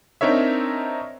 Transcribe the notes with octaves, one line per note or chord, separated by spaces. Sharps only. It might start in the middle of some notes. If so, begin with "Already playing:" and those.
C4 D4 D#4 A#4 C#5 E5